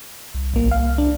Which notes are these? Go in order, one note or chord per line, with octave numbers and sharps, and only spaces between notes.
C2
A1 A#3
F5
D4